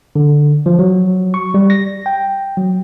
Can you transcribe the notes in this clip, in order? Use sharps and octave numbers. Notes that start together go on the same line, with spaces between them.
D3
F3
F#3
C#6
G3
A#6
G5
F#3